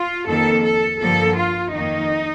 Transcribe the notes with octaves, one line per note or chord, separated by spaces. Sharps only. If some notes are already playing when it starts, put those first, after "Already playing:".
Already playing: F4
F2 D#3 A#3 A4
A4
G2 D3 F3 A#3 A4
F4
F2 D#3 A#3 D#4